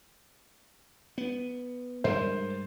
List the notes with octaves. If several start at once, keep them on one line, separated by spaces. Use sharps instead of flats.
B3
G2 G3 G#3 A#4 C5